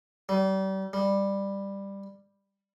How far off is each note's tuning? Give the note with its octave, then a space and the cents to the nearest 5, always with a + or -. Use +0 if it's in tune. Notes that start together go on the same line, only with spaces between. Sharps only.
G3 -35
G3 +10